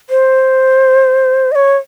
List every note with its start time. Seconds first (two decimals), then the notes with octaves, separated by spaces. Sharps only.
0.10 C5
1.52 D#5
1.55 C#5